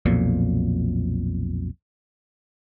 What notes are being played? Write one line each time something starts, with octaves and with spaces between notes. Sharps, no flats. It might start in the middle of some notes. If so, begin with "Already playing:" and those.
B1 F2 A#2